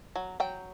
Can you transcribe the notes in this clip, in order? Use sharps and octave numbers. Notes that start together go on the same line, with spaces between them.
F#3
F#3 G5